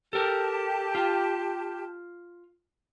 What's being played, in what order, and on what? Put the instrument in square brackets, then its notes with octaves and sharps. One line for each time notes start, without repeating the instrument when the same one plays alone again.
[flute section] G4 A5 [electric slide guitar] A4 A#4
[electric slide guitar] F4